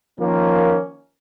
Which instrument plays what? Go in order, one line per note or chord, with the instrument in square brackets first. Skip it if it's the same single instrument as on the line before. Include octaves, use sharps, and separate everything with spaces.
[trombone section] D#3 F3 A#3 C#4